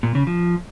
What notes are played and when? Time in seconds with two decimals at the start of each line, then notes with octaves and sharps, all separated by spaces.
0.03 A#2
0.15 C#3
0.27 F3